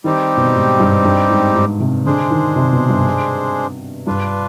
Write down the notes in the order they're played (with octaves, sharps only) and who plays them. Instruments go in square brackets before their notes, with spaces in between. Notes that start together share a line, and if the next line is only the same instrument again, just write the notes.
[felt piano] D#3 [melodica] G3 C4 D#4 G4
[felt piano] B2
G#2
G2
G2
G#2
G#2
C3
[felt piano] D3 [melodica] G#3 D4 G#4 C5
[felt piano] D#3
C3
B2
G2
[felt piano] G2 [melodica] D4 F4 B4